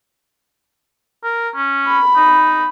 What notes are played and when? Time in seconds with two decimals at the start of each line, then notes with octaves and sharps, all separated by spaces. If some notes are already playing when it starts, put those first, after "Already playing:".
1.24 A#4
1.54 C#4
1.87 B5
2.16 D#4